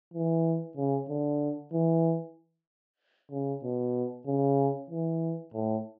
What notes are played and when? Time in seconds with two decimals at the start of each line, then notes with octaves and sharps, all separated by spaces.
0.14 E3
0.77 C#3
1.09 D3
1.73 E3
3.31 C#3
3.63 B2
4.27 C#3
4.90 E3
5.54 A2